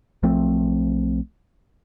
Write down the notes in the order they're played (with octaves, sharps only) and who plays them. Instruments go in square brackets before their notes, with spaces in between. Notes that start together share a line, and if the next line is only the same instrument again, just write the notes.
[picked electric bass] B1 F3 A3 C4